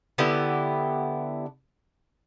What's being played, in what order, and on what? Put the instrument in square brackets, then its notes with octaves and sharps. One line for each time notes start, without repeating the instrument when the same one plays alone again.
[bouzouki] D3 B3 E4 G4